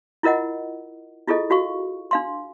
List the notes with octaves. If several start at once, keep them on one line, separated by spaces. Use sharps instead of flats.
E4 F4 A#4 D#5 F#5
E4 F4 G#4 A4 D#5
F4 F#4 F5 C#6
D4 F5 C6